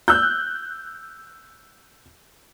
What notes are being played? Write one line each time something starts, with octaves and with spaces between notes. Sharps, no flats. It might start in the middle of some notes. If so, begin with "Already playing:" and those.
E6 F#6 G6